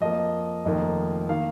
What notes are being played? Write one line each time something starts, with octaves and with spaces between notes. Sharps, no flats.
F2 F3 A#3 D#5
F1 F2 D#3 A#3 D#5
D#3 A#3 F5